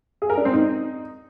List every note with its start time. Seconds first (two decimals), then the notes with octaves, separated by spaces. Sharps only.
0.22 G#4
0.30 A#4
0.37 D4
0.45 C4
0.53 D#4